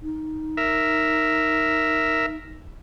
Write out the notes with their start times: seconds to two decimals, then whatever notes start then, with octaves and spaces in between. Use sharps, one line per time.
0.02 D#4
0.57 A#4 E5